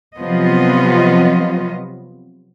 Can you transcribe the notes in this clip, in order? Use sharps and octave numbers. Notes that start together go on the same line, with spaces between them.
C3 F3 F#3 B3 F4 D#5